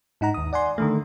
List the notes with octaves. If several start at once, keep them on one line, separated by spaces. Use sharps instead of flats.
G#2 D#4 F#5 A#5
D#2 D#6
D5 F#5 G#5 C6
D3 D#3 A3